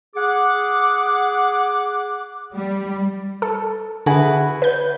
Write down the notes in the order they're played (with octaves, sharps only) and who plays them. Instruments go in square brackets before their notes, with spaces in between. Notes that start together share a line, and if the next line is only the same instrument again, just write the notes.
[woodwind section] G#4 F#5 D6
[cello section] G3
[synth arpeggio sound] A4
[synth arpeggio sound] D3 G#4 [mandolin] E4 F#4 B4
[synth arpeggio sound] B4 G6